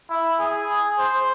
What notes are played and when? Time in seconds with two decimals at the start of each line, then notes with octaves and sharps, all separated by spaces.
0.10 E4
0.40 G#4
0.99 C5